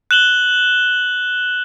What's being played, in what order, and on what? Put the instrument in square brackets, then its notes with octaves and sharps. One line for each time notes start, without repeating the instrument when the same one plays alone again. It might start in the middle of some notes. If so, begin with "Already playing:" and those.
[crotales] F#6 E7 F#7 G7